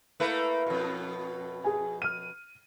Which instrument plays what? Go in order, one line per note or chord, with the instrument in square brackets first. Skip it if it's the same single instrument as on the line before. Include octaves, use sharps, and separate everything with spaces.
[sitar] A3 A#3 B4 [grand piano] E4
[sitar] F2 B2
[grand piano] G#4 G#5
F6 D#7